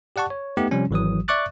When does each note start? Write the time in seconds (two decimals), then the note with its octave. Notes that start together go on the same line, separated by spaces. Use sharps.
0.16 G4 D5 F#5 A5 C#6
0.30 C#5
0.57 A3 B3 D#4 G4
0.71 C3 F3 G3 C#4
0.91 G#1 E3 F#3 D#6
1.28 D5 E5 C#6 D6 F#6 A6